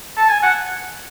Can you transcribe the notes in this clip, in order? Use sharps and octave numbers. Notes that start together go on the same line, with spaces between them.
A5
G#5
F#5